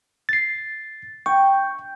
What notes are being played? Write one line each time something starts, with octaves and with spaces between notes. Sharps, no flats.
A6 C7
G5 C#6